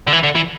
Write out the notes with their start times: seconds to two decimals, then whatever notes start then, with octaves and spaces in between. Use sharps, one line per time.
0.07 D3
0.13 E3
0.24 D3
0.36 E3